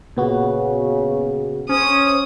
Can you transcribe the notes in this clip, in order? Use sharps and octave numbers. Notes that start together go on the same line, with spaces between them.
A#2 C#3 B3 F#4
C#4 C5 D#6